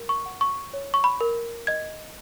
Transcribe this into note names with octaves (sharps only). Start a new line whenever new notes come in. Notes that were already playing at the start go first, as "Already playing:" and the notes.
Already playing: A#4
C#6
F#5
C#6
C#5
C#6
B5
A#4
D#5 G#6